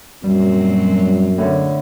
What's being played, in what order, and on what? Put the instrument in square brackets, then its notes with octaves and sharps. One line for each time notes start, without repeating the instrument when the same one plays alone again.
[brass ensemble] F#2 [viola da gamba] A#2 F#3 C4 [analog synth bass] G3
[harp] A2 D3